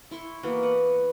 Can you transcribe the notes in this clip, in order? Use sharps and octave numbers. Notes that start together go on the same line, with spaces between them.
E4 C6 C#6
E3 A#3 B3 F#4
B4 F#5